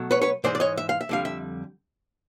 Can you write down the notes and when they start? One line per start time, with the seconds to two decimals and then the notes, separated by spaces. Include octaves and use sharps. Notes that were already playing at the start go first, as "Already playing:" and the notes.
Already playing: B2 F#3 A3
0.11 B4 C#5
0.22 B4 C#5
0.44 G#2 E3 G#3 C5 D5
0.55 D5
0.60 C#5 D#5
0.78 E5
0.89 F5
1.01 E5
1.09 F2 D3 G3 F5
1.25 E5